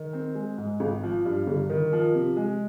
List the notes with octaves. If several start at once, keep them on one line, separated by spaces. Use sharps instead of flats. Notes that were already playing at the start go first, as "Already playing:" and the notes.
Already playing: D#3
C4
G#3
G#2
G#1
F3
G2
G1
D#3
F3
C3
G#3